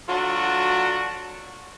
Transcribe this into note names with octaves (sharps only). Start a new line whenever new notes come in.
F#3 D4 F4 F#4 A4 F#5